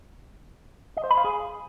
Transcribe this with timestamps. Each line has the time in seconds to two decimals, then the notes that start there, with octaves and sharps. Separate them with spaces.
0.97 D#5
1.04 C5
1.11 B5
1.18 F5
1.24 G#4